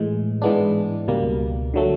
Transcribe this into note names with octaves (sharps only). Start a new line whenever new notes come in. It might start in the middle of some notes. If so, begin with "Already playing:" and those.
Already playing: A2 E3 G#3
G#2 E3 G#3 B3 D4
C#2 B2 G3 A#3
D3 F#3 A3